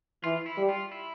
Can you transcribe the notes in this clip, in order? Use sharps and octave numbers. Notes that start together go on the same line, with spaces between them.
E3 F4
E4
G3
F4
E4